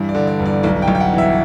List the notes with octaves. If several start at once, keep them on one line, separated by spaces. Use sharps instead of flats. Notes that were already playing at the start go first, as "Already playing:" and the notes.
Already playing: G2 E3
D5
D3
D5
G1
D5
B1 D5
G5
B1
G5
F#5
E3 E5